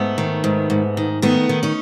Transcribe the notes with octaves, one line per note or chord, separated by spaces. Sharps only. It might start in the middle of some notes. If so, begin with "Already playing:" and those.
Already playing: G#2 A3 B3
D#3
G#2
G#2
D#3
D#3 A3 B3
D#3
C#4 D#4